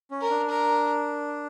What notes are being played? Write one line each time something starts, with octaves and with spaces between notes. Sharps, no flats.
C#4
A#4
D4
A#4